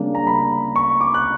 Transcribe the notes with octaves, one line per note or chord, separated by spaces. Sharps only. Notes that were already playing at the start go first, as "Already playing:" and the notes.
Already playing: C#3 G3 A#3 D4
A#5
B5
C#6
D6
F#6